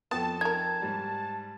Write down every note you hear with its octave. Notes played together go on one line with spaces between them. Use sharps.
F2 B3 A4 G5 A5
D#4 A#4 G#6
G#2 G3